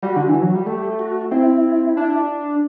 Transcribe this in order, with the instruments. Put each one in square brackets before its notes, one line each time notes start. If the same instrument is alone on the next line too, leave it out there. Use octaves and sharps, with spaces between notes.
[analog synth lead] G3 [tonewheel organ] F#4
[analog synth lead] D3
E3
[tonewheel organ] F#4
[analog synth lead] F#3
G3
[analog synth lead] A3 [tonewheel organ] G4
[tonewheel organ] F#4
[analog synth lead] C4 [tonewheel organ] E4
[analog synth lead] D4